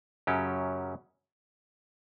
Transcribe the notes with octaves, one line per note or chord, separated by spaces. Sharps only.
F#2 C#3 F#3 C#4 G4